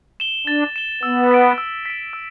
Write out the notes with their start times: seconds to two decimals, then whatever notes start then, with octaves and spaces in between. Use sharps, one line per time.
0.20 E7 G7
0.47 D4 A6
0.76 E7 G7
1.03 B3 E6
1.31 B6 D7
1.58 E6
1.86 B6 D7
2.13 E6